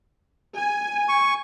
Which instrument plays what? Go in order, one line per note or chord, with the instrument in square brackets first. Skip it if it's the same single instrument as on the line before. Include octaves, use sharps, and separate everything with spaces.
[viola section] G#5
[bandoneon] C#6